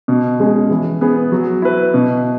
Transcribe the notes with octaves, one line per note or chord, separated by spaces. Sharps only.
B2
G#3 C#4 G#4
E3
B3 G#4 B4
F#3
E4 B4
B2